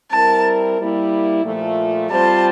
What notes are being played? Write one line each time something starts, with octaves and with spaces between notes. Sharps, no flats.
G3 C4 E4 A#4 A5
G3 A#3 E4
A#2 F3 A3
G3 C4 F4 C5 A5